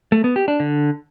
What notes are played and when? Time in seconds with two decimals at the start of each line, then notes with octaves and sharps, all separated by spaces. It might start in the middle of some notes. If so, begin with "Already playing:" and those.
0.12 A3
0.24 B3
0.36 G4
0.48 D4
0.60 D3